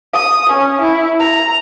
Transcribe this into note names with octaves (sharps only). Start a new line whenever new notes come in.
D#6
C#4
E4
A#5